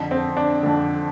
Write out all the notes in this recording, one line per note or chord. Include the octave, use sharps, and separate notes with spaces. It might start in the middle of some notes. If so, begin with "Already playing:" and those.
Already playing: F2 D3
C4
D4
F2 D3